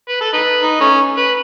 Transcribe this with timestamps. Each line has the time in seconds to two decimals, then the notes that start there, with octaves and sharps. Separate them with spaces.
0.09 B4
0.21 A4
0.33 D#4 B4
0.62 D#4
0.81 A3 C#4
1.17 B4